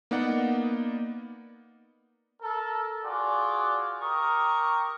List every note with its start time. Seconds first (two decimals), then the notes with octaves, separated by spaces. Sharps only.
0.11 A#3 B3 D#4 D5 F#5
2.42 A4 A#4
3.05 F4 F#4 G#4 D5
4.01 G4 A#4 C#6 D#6